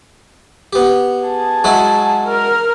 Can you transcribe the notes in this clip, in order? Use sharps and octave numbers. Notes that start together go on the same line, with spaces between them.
B3 G4
G#4 A5
F#3 G#3 E4
A#4 F6